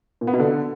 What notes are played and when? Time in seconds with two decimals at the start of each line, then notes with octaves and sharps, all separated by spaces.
0.21 A#2
0.27 B3
0.33 B2
0.40 D3